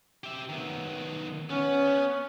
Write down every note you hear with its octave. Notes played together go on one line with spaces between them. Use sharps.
G4 E5
D#3 B3
B3 C#4